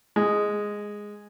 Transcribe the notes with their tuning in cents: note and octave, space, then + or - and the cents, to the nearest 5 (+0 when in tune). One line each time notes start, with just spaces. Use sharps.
G#3 -5